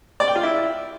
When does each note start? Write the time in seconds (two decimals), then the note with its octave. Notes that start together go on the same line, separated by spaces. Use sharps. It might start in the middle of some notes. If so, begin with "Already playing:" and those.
0.20 D5
0.28 G5
0.35 F4
0.43 E4